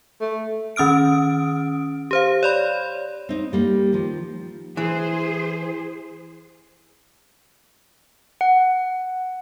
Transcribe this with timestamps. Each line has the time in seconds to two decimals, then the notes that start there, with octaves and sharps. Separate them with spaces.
0.21 A3
0.76 D#3 C#4 D#6 F6 D7
2.11 G4 C5 F5
2.43 C#5 D5 B5
3.29 C4 D#4
3.53 G3 A#3
3.93 D#3 F3
4.77 E3 G#4 C5
8.41 F#5